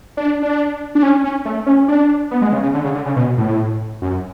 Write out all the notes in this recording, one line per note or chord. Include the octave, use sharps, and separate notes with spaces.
D4
D4
D4
C#4
C#4
A3
C#4
D4
B3
G#3
C#3
C#3
D3
C#3
D3
C#3
B2
A2
F#2